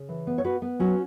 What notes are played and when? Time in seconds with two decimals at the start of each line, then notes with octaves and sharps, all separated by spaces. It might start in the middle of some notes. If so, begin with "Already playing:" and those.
Already playing: C#3
0.09 E3
0.27 B3
0.38 C#5
0.44 B3 F#4 B4
0.62 B3
0.79 F#3 C#4 F#4